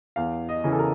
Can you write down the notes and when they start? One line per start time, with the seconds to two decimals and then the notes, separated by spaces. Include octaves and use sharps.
0.16 E2 F5
0.49 D#5
0.64 C#3 E3
0.72 A4
0.79 A#4